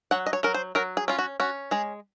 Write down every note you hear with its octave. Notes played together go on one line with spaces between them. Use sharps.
F#3 F#5
D#5
C#5
F#3 A#4
C5
F#3 A#4
G#4
C#4 F4
F#4
C#4 F#4
G#3 G#4